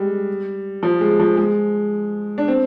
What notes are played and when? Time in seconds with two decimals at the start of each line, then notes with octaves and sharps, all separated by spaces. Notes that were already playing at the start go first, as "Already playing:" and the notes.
Already playing: G3 G#3
0.83 F3
1.01 G#3
1.20 F3
1.37 G#3
2.38 D4
2.48 C4